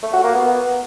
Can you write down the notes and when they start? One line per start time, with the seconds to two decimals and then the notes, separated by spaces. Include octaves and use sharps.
0.03 A3
0.13 F#4
0.24 A#3
0.34 B3